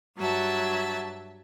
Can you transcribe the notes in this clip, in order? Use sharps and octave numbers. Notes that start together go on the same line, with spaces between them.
G2 F#3 E5 A5